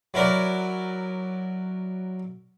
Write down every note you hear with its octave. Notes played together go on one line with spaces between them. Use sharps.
F#3 E4 A#4 D5